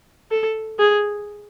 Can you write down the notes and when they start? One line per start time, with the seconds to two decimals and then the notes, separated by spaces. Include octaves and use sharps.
0.31 A4
0.79 G#4